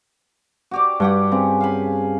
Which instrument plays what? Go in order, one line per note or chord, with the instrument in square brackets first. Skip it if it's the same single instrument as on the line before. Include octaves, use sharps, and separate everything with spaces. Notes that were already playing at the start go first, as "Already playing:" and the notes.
[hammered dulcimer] F#4 G4 D5
[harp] G2 [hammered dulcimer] G4 F#5 G5
[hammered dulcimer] C#3 [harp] C4
[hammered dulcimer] F5 G#5 B5